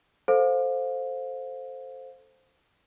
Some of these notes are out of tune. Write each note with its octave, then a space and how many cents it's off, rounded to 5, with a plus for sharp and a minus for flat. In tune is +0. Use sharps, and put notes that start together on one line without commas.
A4 +0 C5 +0 F5 +25